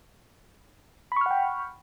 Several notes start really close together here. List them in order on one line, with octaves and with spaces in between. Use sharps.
B5 C#6 F6 F#5 G5